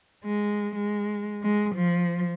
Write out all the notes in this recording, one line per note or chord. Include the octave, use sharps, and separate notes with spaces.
G#3
G#3
G#3
F3